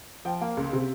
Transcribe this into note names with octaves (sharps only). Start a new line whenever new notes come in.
F3 G5
A#3 F5
C#2
C3